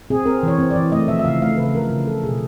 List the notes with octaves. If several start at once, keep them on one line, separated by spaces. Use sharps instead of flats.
C4 G#4
C4 A#4
E3 C#5
C4
D5
E3
A3 D#5
F3 E5
E5
C#3 F5
A3 F5
C#3 B4
F3 A#4
C#3
F3 A4
B2 G#4